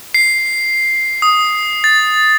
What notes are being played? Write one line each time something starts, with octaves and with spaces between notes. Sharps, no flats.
C7
D#6
A6